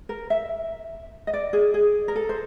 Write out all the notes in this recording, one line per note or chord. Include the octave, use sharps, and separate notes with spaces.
A#4
E5
D#5
D5
G#4
G#4
A#4
A4
C5